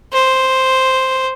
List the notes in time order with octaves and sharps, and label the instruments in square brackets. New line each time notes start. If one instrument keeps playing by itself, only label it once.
[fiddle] C5